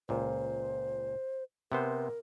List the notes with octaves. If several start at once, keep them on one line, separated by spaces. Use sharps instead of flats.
C#2 A#2 C5
C3 B3 A#4 C5